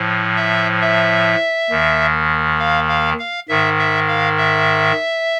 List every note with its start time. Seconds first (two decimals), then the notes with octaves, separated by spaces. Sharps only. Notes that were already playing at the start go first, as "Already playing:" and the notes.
Already playing: A2 F3
0.36 E5
0.81 E5
1.70 D#2 D#3
2.59 F5
2.89 F5
3.19 F5
3.49 G#2 D#3 E5
3.79 E5
4.08 F5
4.38 E5